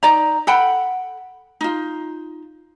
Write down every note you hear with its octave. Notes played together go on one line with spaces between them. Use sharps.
D#4 D5 A#5
A4 F#5 G5 B5
D#4 F4